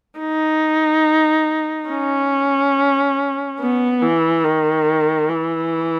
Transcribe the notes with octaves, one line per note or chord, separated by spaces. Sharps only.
D#4
C#4
B3
E3
D#3
E3